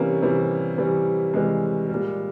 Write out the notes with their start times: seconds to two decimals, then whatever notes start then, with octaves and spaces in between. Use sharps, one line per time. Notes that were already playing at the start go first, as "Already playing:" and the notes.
Already playing: C3 E3 G3 A#3 C#4
0.23 C3 E3 G3
0.78 C3 E3 G3
1.34 C3 E3 G3 G#3
1.89 G3
1.94 A#2